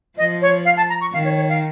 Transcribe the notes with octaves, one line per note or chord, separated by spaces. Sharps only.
F3 D#5
C#5
F5
A5
A#5
C#6
D#3 F5
C#5
C#5
F5